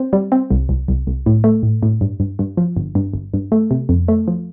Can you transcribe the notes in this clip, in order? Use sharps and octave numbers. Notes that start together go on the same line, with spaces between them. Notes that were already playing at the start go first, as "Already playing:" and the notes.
Already playing: C4
G3
C4
C2
C2
C2
C2
A2
A3
A2
A2
G2
G2
G2
F3
G1
G2
G1
G2
A3
C3
F2
A3
F3